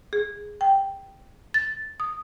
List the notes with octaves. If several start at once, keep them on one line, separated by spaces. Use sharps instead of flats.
G#4
G5
A6
D#6